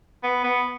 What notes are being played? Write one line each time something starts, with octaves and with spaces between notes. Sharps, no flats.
B3
B3